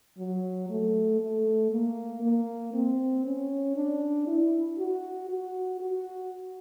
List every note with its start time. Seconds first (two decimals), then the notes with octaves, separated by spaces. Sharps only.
0.18 F#3
0.70 A3
1.20 A3
1.72 A#3
2.23 A#3
2.74 C4
3.25 C#4
3.76 D4
4.27 E4
4.79 F#4
5.29 F#4
5.81 F#4